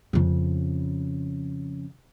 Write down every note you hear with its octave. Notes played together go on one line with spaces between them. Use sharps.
F2 C#3